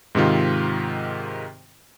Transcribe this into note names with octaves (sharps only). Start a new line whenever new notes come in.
G#2 C3 D#3 F4